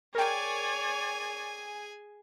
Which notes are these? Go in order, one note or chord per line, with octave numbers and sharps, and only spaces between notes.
G#4 A#4 C#5 D5 G5 G#5